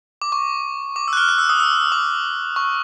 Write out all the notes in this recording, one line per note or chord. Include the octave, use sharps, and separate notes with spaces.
D6
C#6
D6
E6
F#6
F6
F#6
E6
D#6
E6
D6
C#6